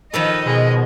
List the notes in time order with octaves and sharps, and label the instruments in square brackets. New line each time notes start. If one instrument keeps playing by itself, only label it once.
[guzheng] D#3 F3 A4 [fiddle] B4 [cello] D#5
[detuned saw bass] B2 [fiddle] G#3